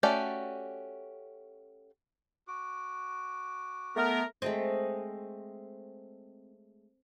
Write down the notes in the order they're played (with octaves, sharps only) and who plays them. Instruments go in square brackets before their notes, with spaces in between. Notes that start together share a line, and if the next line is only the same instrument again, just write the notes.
[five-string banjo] A3 C#4 F#4 G4 D5
[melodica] F#4 D6
[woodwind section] A3 B3 A#4
[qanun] G#3 A3 D#5 [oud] C4